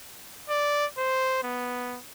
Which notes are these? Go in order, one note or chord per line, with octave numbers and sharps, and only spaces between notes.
D5
C5
B3